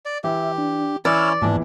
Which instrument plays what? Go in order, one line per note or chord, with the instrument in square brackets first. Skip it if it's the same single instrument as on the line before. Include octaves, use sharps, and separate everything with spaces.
[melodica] D5
[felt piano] E3 [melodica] G4 [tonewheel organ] E5
[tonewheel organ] D4
[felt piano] E3 [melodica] C#4 E4 C#5 [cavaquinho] D5 [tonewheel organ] E6 F6
[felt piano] A#1 E2 E3 [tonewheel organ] G#2 [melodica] D4